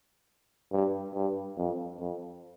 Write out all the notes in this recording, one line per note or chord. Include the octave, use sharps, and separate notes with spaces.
G2
G2
F2
F2